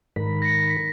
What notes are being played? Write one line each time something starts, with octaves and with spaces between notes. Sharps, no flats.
G#2 D#3 A#4 B5
A#6 C#7
B6